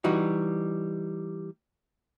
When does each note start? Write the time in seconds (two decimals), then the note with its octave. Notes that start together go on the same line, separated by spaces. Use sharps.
0.04 E3 G3 D#4 F#4